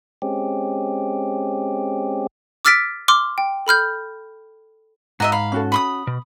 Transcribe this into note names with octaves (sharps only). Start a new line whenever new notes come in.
G#3 C4 C#4 G4
D6 E6 F6 A6 B6 D7
C6 D6 F6
G5
A4 B5 F6 G6
G#2 F#4 D#5 E5 A#5
F5 B5
C#4 F#4 A4
B5 C6 D#6
B2